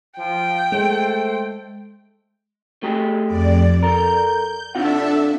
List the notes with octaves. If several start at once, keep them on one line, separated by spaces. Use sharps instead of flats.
F3 G5
G#3 A3 A4 C5
A3 G4 G#4
F2 D5
A4 A#4 G6
C3 D4 F4 A4 E5 F#5